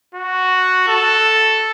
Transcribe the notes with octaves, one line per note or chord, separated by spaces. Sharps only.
F#4
A4